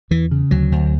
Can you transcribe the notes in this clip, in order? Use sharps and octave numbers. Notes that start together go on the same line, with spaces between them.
E2 E3
C#3
D2 F#3
D2